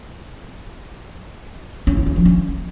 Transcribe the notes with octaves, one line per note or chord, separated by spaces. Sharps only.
C#4
E4
C#4
F3
C#4